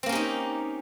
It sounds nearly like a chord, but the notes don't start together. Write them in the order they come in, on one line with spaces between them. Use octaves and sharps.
C4 A#3 C#4 G4 D#4